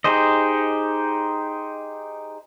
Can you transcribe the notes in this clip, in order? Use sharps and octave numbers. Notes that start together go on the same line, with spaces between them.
D#4 G4 G#4 C5 D#5